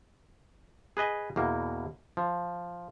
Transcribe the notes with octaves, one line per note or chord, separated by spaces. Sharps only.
G#4 B4 D#5 G#5
E2 B2 A#3
F3